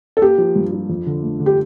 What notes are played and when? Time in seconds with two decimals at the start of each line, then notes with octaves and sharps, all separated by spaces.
0.17 A4
0.21 A#3 G4
0.38 F3
0.56 G2
0.72 F3
0.89 F2
1.06 D3
1.23 A3
1.40 D3
1.46 G4